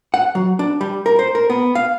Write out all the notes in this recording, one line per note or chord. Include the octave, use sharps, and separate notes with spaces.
F#5
F#3
D4
G3
A#4
C5
A#4
B3
F5